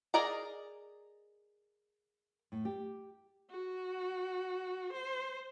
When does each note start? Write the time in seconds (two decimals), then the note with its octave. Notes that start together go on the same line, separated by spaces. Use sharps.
0.14 G#4 A#4 D5 D#5 A#5
2.52 A2
2.65 G4
3.51 F#4
4.93 C5